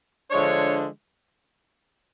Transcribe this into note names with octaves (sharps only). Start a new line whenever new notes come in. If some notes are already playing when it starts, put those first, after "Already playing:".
D3 F3 G#3 D4 C#5